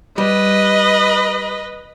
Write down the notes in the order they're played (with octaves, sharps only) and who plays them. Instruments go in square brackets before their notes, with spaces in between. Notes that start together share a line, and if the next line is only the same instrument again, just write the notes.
[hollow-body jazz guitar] G3 [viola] B4 D#5